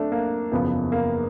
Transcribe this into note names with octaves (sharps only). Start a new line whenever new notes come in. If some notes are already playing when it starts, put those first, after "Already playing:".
Already playing: D2 A3 C4 D4
A#3
F#1 E2 C#3 F3 B3
A#3